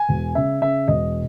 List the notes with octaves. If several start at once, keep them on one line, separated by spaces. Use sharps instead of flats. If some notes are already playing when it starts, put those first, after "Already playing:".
Already playing: G#5
E1
C#3 E5
C#3 E5
E1 D#5